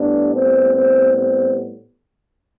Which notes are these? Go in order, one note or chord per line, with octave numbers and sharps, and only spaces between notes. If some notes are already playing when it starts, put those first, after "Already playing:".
Already playing: A2 G3 B3 D4
C4
C4
C4